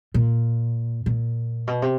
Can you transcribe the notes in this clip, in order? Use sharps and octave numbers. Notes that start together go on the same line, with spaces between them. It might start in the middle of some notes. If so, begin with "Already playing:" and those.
A#2
A#2
B2
C3